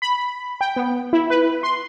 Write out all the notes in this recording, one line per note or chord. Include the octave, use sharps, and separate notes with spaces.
B5
G5
B3
E4
B4
C6